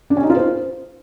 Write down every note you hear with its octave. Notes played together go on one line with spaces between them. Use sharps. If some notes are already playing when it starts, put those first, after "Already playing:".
D4
C#4
D#4
F4
C5